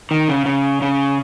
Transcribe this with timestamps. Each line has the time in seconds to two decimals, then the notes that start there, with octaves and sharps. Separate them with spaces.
0.11 D#3
0.28 C#3
0.46 C#3
0.82 C#3